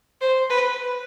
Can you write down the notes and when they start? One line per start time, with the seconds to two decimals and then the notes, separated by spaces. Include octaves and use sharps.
0.21 C5
0.50 B4